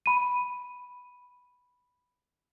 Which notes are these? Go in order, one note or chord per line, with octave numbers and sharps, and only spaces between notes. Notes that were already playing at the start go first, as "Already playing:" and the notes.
B5 D#7